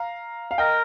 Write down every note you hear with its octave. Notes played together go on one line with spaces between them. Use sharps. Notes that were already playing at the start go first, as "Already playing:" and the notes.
Already playing: F5 A#5
F5
A#4 D#5 G5